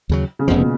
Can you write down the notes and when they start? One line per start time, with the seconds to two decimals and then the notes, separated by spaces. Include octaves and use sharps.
0.09 D#2 C#3 F#3
0.39 C#3
0.48 F1 F2 B2 F3
0.61 A#2